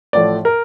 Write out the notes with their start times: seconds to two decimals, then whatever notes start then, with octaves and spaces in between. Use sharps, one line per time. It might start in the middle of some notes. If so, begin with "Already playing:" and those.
0.13 A1 A2 F3 A3 D5
0.45 A#4